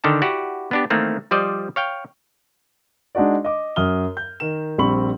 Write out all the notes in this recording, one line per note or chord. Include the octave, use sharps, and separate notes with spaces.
D3 D#3 G5 A5
E4 F#4 G4 D5 F#5
B3 D4 G4
D#3 E3 A3 A#3 C4
F3 G3 C5 D5 D#5
C#5 F5 G5
G#3 D4 D#4 F#4 D5
D#5 D6
F#2 D#6 F6 G7
G6
D#3 A#4 E7
A#1 G3 C4 B5 C#6 F#7